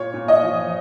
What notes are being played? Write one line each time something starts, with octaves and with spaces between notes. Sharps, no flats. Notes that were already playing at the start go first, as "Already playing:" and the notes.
Already playing: A#2 C#5
A#2
D#5
F3